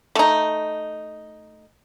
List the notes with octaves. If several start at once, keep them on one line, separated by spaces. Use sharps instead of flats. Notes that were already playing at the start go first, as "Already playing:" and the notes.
A3 D#4